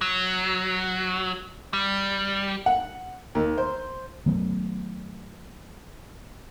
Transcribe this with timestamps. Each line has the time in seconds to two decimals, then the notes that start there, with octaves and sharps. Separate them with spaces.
0.01 F#3
1.73 G3
2.66 F#5
3.35 D#2
3.58 C5
4.26 D#3 F#3 A3 B3